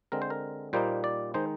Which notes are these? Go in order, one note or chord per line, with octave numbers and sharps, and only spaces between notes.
D3 G#3 C4 A#4
C5
A#4
A#2 G3 A#3 D#4 C5
D5
D#3 G#3 D#4 C5